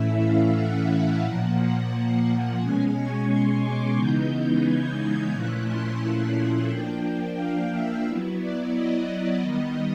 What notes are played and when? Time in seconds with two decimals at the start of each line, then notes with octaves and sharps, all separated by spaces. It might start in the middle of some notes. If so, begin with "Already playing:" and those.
Already playing: A2 E3 A3 C#4 E4 E5
0.20 F5
0.54 F#5
0.89 F5
1.23 A#2 F3 A#3 F#5
2.59 B2 G#3 C#4 G#5
2.93 C#6
3.27 C6
3.61 D6
3.96 C#3 E3 G#3 B3 D#4 G6
4.64 G#6
4.98 G6
5.32 A#2 F3 A3 C#4 E4 F#6
5.66 C6
6.68 F3 A#3 D4 G5
7.03 G5
7.36 F5
7.71 E5
8.05 F#3 B3 E4
8.39 D5
8.73 D#5
9.08 D#5
9.42 D#3 G3 B3